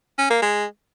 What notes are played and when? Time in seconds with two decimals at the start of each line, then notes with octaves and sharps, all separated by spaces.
0.18 C#4
0.30 A#3
0.42 G#3